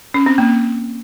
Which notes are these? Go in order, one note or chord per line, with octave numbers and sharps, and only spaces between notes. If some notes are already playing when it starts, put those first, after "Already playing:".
C#4
C4
A#3